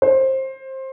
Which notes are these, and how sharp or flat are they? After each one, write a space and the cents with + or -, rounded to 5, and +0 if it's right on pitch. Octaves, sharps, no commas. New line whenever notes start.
C5 +20